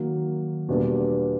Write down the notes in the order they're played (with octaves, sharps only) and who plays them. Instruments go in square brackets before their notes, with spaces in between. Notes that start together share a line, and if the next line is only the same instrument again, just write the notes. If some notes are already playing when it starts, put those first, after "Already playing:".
Already playing: [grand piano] D#3 F#3 A#3
E2 B2 G3 A#3 D4